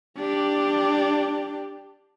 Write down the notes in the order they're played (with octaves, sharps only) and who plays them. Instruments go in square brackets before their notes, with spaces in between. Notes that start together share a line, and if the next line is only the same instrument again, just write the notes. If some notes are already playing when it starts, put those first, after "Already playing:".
[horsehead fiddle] D4 G4